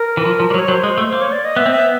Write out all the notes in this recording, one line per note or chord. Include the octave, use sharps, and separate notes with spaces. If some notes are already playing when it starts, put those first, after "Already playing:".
Already playing: A#4
E3
F3
F3
G3
F#3
C#5
F#3 C5
G#3
A3
A#3 C5
C#5
D5
D#5
B3 E5
C4
B3 E5